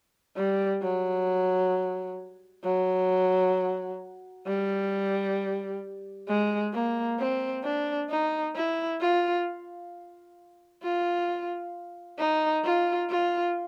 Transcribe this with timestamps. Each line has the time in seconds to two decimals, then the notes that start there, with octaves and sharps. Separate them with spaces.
0.37 G3
0.82 F#3
2.64 F#3
4.46 G3
6.28 G#3
6.73 A#3
7.19 C4
7.64 D4
8.10 D#4
8.56 E4
9.01 F4
10.83 F4
12.19 D#4
12.64 F4
13.10 F4